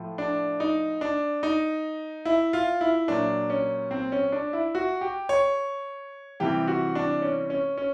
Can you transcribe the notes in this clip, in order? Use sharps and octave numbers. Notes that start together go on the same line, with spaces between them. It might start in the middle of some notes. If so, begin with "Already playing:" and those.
Already playing: A2 F3
D4
D#4
D4
D#4
E4
F4
E4
A#2 F#3 D4
C#4
C4
C#4
D4
E4
F#4
G4
C#5
C3 E3 G3 G4
F#4
D4
C#4
C#4
C#4